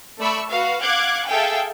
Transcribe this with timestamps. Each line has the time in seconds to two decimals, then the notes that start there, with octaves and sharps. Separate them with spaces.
0.19 A3 D5 B5 C#6 E6
0.48 F#4 B4 F5
0.80 F5 F#5 D6 F#6 G#6
1.27 G#4 A4 E5 F5 G5 G#5